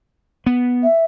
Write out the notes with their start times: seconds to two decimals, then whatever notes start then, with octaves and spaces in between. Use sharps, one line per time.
0.46 B3
0.83 E5